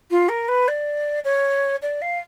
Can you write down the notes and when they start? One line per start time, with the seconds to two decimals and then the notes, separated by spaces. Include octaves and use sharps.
0.10 F4
0.28 A#4
0.48 B4
0.68 D5
1.24 C#5
1.82 D5
2.01 F5